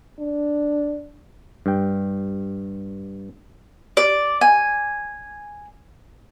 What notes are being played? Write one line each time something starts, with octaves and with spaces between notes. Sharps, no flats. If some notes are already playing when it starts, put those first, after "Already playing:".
D4
G2 G5
D5
G#5